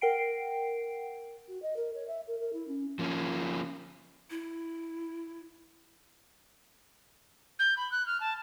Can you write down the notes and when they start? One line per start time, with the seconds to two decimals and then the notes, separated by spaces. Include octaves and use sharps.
0.01 A#4 F#5 G5 C7 D7
1.48 F#4
1.62 D#5
1.76 A#4
1.94 C#5
2.07 E5
2.27 A#4
2.40 A#4
2.53 E4
2.68 C#4
2.99 F3 A#3 C#4
4.30 E4
7.59 G6
7.77 B5
7.91 F#6
8.06 F6
8.20 A5